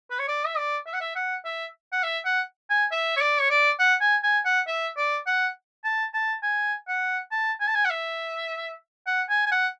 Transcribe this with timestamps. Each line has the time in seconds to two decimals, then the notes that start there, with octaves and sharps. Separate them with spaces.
0.11 B4
0.19 C#5
0.28 D5
0.46 E5
0.57 D5
0.86 E5
0.93 F#5
1.00 E5
1.15 F#5
1.45 E5
1.92 F#5
2.03 E5
2.25 F#5
2.70 G#5
2.91 E5
3.17 C#5
3.21 D5
3.41 C#5
3.50 D5
3.79 F#5
4.01 G#5
4.24 G#5
4.45 F#5
4.67 E5
4.97 D5
5.26 F#5
5.84 A5
6.14 A5
6.43 G#5
6.88 F#5
7.31 A5
7.60 G#5
7.68 A5
7.75 G#5
7.85 F#5
7.90 E5
9.07 F#5
9.30 G#5
9.46 G#5
9.52 F#5